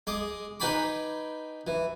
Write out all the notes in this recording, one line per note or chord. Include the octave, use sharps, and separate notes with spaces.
G#3 D6 D#6
D#4 B4 G5 G#5 B5 D6
E3